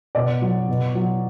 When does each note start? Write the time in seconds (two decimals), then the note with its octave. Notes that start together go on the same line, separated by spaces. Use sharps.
0.15 B2 D5
0.42 F#3
0.69 B2
0.95 F#3